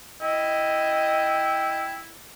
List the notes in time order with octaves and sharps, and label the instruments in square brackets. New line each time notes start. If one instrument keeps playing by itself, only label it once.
[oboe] E4 [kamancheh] D#5 [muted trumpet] G5